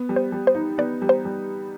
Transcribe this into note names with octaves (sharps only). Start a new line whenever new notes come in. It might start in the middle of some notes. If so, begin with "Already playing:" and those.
Already playing: B3
G3
C5
G3
C5
D#4
B3 D5
G3
C5
G3